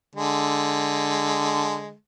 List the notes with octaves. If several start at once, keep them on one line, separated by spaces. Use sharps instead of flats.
D3 G#3